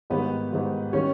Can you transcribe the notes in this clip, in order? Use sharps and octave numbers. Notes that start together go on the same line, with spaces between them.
G#2 D#3 G3 B3 B4
G#2 D#3 G3
D#3 G3 C#4 C#5